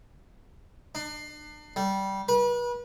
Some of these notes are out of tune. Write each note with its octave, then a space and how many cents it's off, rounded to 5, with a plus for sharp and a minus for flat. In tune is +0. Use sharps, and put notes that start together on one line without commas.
D4 +35
G3 -15
B4 -35